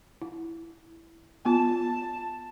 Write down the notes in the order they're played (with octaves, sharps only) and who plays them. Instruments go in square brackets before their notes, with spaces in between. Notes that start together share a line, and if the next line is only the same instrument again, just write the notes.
[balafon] E4
[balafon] B3 F4 [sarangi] A5